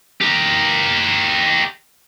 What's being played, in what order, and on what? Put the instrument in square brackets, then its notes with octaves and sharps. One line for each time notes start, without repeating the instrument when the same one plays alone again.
[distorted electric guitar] G4 A#4